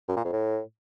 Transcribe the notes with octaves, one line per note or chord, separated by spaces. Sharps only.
F#2
A#2
F2
A2